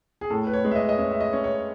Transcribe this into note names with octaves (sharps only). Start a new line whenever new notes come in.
G#4
A2 A4
B4
C#5
G#3
E5
D#5
D#5
C#4 E5
E5
D#5
C#4
C#5